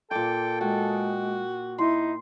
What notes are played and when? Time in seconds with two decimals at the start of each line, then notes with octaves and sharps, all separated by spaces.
0.11 A#2 A4 G5 D6
0.61 G#3 F#4 G5
1.78 D#4 E4 C6